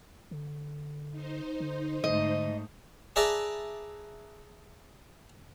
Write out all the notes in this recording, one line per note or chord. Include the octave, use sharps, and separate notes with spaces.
D3
D#4 C5
D3
G#2 D3 A3 D#5
G#4 B4 D5 E5 A5 A#5